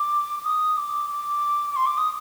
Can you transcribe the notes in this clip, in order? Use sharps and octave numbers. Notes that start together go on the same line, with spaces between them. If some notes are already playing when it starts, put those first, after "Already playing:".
Already playing: D6
D#6
D6
D6
D6
C6
D6
D#6